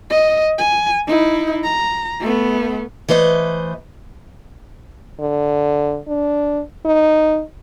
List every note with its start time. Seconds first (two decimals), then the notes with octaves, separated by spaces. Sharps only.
0.10 D#5
0.58 G#5
1.07 D#4 E4
1.64 A#5
2.20 A3 B3
3.08 E3 A3 B4 C5 D#5
5.20 D3
6.08 D4
6.85 D#4